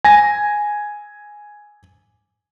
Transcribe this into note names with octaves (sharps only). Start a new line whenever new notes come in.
G#5 A#6